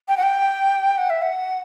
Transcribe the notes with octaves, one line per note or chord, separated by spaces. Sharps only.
G5
F#5
G5
F#5
E5
F#5